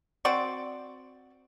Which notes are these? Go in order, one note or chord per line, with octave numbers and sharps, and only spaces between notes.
C4 F#4 C5 D5